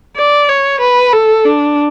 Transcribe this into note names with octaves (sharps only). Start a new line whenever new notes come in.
D5
C#5
B4
A4
D4